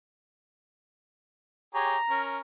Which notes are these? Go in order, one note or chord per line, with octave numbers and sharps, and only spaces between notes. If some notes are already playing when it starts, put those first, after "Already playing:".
G4 G#4 C#5 A#5
C#4 A#4